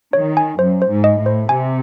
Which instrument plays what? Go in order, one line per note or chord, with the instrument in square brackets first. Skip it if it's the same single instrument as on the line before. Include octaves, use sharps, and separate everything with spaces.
[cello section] D#3 [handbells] C#5
[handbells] G#5
[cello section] F#2 [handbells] C5
[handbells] C5
[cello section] G#2
[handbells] D#5
[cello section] A2
[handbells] C5
[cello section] C3 [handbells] G#5